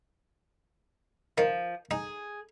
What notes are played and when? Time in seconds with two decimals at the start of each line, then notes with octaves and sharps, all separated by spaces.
1.38 D#3 F3
1.91 D#4 G#4